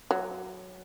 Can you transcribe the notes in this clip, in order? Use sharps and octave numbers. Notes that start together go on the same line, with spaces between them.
F#3